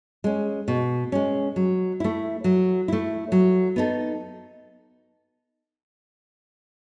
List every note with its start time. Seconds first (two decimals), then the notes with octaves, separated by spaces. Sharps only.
0.24 G#3 C#4
0.68 B2
1.12 G#3 C#4
1.56 F#3
2.00 A3 E4
2.44 F#3
2.88 A3 E4
3.32 F#3
3.76 B3 D#4 A4